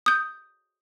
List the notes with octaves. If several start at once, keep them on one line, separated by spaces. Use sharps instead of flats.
D#6 G6